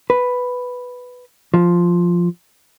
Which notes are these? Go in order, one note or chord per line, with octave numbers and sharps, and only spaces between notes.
B4
F3